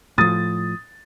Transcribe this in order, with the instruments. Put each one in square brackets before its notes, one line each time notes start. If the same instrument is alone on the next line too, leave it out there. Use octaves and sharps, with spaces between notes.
[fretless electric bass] A2 F3 [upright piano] D#6 A6